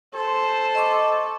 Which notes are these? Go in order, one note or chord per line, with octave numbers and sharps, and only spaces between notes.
A4 C5
D#5 C#6 D6